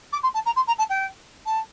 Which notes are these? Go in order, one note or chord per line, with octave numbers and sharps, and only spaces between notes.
D6
C6
A5
A#5
C6
A#5
A5
G5
A5